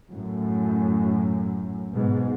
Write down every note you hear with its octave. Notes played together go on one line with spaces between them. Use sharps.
F#2 A2
G#2 B2